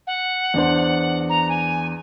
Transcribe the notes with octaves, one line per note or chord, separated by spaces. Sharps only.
F#5
E2 D4 C5
A#5
G#5